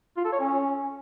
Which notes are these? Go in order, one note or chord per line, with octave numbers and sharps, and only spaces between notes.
F4
A4
C#5
C#4